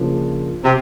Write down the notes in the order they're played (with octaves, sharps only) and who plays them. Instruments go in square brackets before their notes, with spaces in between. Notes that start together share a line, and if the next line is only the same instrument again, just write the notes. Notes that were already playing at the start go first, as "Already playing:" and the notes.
Already playing: [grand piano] C#3 F3 A#3 D4 F4
[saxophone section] C3